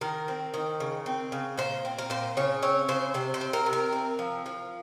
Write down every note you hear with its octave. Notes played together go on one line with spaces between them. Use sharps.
D#3 A#4
C4
D#3
C#3
C4
C#3
A#2 C5
C4
A#4
A#2 C5
C#3 C#5
C4 C#5
C#3 C5
C3 C5
C5
C4
A#4
C3
A#4
C4
F3
F3